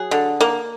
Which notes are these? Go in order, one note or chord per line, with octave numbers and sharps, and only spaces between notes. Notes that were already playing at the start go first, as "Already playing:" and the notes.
Already playing: F#3 G#4
D3
A#3